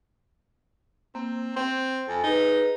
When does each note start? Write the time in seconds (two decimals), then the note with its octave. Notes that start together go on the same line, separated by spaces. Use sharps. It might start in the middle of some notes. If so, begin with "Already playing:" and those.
1.15 A#3 C4
1.56 C4 G5
2.08 F2 G#5
2.24 D#4 G#4 B4